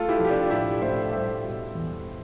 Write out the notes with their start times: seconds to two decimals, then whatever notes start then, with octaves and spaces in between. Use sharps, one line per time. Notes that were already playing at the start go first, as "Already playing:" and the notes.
Already playing: A3 F4 A4
0.09 E4 G4
0.19 F3
0.25 G4
0.30 D4 F4
0.50 A2 E4 G4
0.82 A2 C5 E5
1.13 G3 C5 E5
1.44 B2
1.75 E2